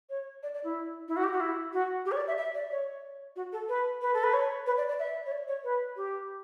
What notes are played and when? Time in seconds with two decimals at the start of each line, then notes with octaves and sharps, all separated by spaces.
0.10 C#5
0.43 D5
0.54 D5
0.64 E4
1.08 E4
1.16 F#4
1.23 G4
1.32 F#4
1.40 E4
1.73 F#4
2.05 G4
2.12 C#5
2.16 D5
2.27 E5
2.37 E5
2.54 D5
2.71 C#5
3.36 F#4
3.52 A4
3.69 B4
4.01 B4
4.14 A4
4.23 B4
4.33 C#5
4.66 B4
4.77 D5
4.88 D5
4.99 E5
5.26 C#5
5.31 D5
5.48 C#5
5.64 B4
5.96 G4